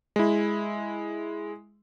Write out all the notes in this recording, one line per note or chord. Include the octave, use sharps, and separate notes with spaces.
G#3 E4